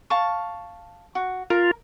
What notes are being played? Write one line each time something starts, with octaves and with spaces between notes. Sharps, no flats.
F5 A5 C#6
F#4
F4 A#4